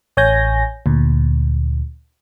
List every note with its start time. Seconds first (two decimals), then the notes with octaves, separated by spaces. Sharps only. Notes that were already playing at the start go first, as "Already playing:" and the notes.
0.17 A1 C#5 G#5 G6 A#6
0.86 D2 A#2